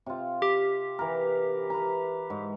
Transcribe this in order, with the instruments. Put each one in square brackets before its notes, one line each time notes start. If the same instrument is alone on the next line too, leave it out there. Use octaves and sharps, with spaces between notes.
[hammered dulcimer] C3 F4
[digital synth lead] G4
[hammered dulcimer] E3 A#4
B4 A#5
G#2